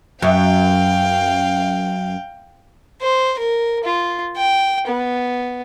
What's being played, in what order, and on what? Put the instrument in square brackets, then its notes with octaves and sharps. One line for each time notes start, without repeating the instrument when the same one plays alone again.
[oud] F#2 [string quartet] F5 G5
[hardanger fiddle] C5
A#4
F4
G5
B3